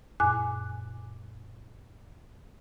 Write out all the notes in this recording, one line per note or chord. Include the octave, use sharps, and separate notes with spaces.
F#2 A#2 G#5 D6 F#6